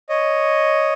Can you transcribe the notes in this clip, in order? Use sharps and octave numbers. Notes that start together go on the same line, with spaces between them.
C#5 D#5